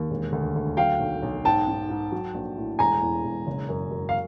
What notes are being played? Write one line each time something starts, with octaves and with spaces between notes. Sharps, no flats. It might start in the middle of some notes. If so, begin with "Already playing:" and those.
Already playing: D#2
E1
D2
D2
F#3 F5 G5
B1
B1
G#2 G5 A5
G#2
G#2
F#3
A#1
A2
E1 G#5 A#5
E2
E1
F#1
F#2
F#2
F5